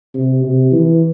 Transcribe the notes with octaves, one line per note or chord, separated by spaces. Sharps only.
C3
C3
E3